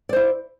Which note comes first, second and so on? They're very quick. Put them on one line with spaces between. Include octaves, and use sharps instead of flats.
D5 C5 E4